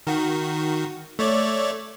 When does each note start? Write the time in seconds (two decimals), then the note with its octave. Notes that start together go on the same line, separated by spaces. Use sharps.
0.07 D#3 F#4
1.19 A3 C#5 D5